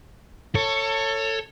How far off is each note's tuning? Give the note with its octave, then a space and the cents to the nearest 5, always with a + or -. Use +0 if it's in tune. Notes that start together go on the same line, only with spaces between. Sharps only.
A4 +25 C#5 +0